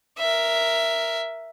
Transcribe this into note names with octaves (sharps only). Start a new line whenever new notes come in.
A#4 E5